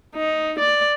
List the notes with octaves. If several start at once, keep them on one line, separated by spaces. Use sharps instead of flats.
D#4
D5